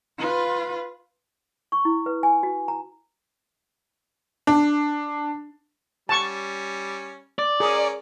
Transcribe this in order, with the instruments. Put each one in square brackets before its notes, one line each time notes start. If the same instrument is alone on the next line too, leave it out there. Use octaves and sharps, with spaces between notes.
[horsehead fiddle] F4 B4
[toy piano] C#6
E4
B4
G#5
F#4
A#5
[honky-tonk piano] D4
[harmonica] G3 C#4 [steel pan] A5 C#6
[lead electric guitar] D5
[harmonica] C#4 A#4 [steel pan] G#4